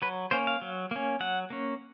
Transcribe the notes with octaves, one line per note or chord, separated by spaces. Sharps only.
F#3 B4
A#3 C#4 C5
F5
F#3
A#3 C#4
F#3 F#5
A#3 C#4